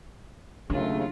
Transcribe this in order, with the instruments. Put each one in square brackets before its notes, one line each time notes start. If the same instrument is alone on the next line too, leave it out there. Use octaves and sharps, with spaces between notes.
[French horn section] D#2 C#3 [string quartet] F#3 F4 [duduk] A3 [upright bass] D4